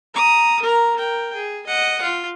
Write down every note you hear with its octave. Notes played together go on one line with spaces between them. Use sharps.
A#5 D#6
A#4 A#5
A#4 G5
G#4
D#5 F#5
F4